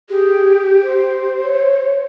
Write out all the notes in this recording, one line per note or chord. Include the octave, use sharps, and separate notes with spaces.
G4 G#4
C5
C#5